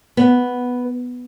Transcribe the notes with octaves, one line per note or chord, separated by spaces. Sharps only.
B3